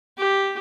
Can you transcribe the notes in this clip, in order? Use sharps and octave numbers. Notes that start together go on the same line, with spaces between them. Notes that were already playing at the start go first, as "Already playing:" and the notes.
G4